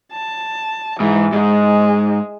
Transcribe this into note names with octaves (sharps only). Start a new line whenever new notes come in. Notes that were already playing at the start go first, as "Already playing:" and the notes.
A5
G#2 E3
G#2 G#3